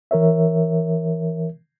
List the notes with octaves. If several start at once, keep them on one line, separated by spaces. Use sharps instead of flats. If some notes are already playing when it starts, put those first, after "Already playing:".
E3 A#4 C#5 E5